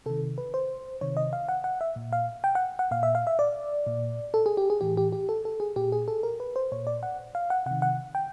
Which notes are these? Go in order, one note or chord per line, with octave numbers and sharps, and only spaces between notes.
C3 D#3 A4
B4
C5
C3 D#3 C#5
D#5
F5
F#5
F#5
E5
A#2
F5
G5
F#5
F#5
A#2 F5
E5
F5
E5
D5
A#2
A4
G#4
G4
G#4
A2 E3 G4
G4
G4
A4
A4
G#4
A#2 G4
G#4
A4
A#4
B4
C5
A#2 C#5
D5
F#5
F5
F#5
C3 D#3 F#5
F#5
G5